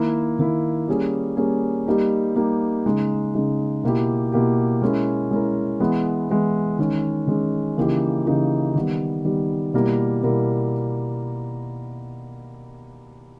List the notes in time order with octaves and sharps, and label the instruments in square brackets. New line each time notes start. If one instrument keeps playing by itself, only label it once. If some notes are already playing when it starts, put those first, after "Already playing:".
Already playing: [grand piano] D#3 A#3 E4
D#3 A#3 E4
G3 A#3 C#4 G#4
G3 A#3 C#4 G#4
G3 A#3 D#4 G4
G3 A#3 D#4 G4
C#3 G#3 D#4
C#3 G#3 D#4
B2 A#3 E4 G4
B2 A#3 E4 G4
G#3 C#4 E4 A#4
G#3 C#4 E4 A#4
E3 G#3 B3 E4
E3 G#3 B3 E4
D#3 G#3 C#4
D#3 G#3 C#4
C#3 E3 A#3 D#4 G4
C#3 E3 A#3 D#4 G4
D#3 G3 B3
D#3 G3 B3
B2 G3 A#3 E4 A#4
B2 G3 A#3 E4 A#4